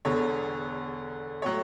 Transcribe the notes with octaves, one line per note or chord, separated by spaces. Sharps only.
E1 E2 D3 C#5
A2 F#3 C#5